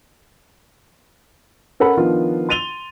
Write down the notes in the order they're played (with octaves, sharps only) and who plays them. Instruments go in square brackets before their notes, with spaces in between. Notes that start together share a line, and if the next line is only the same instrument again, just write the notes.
[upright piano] C#4 A4 A#4 F#5 B5
D#3 F3 B3 D4 F4
C6 A6 D#7 F7 G7